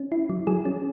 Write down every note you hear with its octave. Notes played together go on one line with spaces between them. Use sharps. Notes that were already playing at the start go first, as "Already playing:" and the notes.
Already playing: C#4
E4
F#3
F#3 G#4
C#4